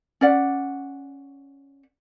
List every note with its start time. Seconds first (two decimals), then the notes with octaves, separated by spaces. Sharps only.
0.21 C#4 D5 F#5